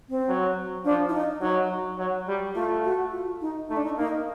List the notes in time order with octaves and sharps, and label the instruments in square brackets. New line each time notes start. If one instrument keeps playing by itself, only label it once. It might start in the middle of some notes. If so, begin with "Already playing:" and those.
[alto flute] C4
[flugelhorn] F#3
[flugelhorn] F3 [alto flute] D4
[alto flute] E4
D#4
[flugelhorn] F#3 [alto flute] D#4
[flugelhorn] F#3
G3
[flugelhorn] A3 [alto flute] F4
[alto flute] F#4
F4
D#4
[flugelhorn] A3 [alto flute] D#4
[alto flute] D4
D#4
[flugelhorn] A#3 [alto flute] D#4